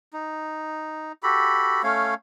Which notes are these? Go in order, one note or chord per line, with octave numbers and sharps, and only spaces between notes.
D#4
F#4 G4 A4 B5
A3 C#4 C#5 F5